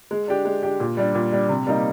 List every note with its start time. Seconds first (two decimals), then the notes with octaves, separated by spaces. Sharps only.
0.11 G#3
0.28 D4 G4
0.45 G#3
0.63 D4 G4
0.80 A#2
0.97 G3 D4
1.15 A#2
1.32 G3 D4
1.49 C3
1.67 G3 A#3 D#4